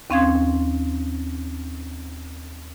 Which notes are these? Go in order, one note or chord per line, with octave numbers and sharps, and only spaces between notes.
D#2 C4 C#4 F5 C6 G#6